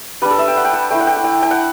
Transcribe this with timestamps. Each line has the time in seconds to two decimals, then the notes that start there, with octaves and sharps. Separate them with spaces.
0.22 G3 D4 B4
0.31 A4
0.39 E5
0.48 G5
0.57 F#5
0.65 G5
0.73 F#5
0.91 A3 E4 G5
1.00 F#5
1.07 G5
1.16 F#5
1.24 G5
1.43 G5
1.51 F#5